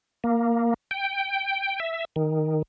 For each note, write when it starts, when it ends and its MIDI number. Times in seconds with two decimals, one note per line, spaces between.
0.24 0.74 58
0.91 1.80 79
1.80 2.05 76
2.16 2.62 51